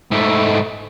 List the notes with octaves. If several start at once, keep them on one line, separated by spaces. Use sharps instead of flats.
G#2 A3